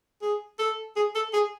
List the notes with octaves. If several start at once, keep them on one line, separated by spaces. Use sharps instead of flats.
G#4
A4
G#4
A4
G#4